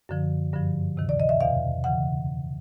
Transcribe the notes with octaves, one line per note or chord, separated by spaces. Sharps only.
F#2 D3 F3
G2 D3 F3
D2 C3 D#3
D5
D#5
E5
E2 B2 F5
C#3 E3 F#5